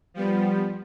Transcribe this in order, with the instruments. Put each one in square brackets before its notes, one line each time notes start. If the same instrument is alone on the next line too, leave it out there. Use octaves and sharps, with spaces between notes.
[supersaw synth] F3 G3 B3